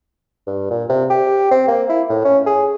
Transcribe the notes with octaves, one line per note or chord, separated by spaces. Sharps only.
G2
A#2
C3
G4
C4
A#3
E4
A2
C#4
G#4